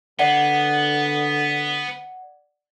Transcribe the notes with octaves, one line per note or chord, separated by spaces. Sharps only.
D3 B3 D5 F#5